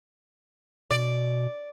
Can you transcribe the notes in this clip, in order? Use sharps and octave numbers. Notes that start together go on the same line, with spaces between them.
B2 D5